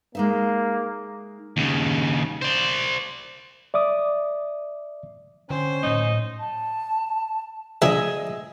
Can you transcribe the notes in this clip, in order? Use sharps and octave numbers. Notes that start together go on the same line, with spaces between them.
G#3 A#3 D#4 E5
D#2 C#3
C5 D5
D5 E5 D6 D#6
D3 C4 C#4 C5
A2 F#3 A#3 D#4
A5
D3 F3 D4 G#4 D#5 E5